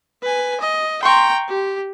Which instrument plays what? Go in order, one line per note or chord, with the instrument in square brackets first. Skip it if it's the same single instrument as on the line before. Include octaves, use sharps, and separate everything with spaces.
[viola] B4 G#5
D#5
[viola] G5 A#5 [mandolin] C6 C#6
[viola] G4